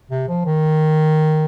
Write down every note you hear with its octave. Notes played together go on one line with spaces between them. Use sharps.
C3
F3
D#3